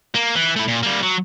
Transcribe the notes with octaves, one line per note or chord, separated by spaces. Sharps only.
A#3
E3
A3 E4
A#2
G3 A#3
F#3